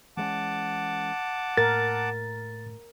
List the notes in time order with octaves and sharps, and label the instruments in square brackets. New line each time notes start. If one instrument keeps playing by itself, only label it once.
[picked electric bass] E3 G#3 C#4 [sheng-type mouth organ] F#5 A5 D6
[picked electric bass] A2 [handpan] A#4 [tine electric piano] A6